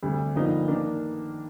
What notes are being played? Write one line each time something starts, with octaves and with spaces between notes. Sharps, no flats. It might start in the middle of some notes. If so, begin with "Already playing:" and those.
D2 C3 G3
G1 G2 F3 A#3 D#4
D#3 A#3 D4